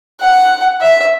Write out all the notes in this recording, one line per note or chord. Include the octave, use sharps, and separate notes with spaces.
F#5
E5